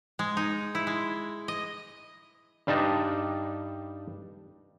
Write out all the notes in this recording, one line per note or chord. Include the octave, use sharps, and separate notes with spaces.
G#3
D#4
E4
G#3
D#5
G2 G3 D4 D#4 A5